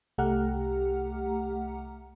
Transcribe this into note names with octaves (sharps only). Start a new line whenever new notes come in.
C2 A3 G4 F#5 A#5 F6